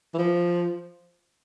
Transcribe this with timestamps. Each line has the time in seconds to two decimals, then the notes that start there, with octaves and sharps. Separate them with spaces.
0.14 E3
0.18 F3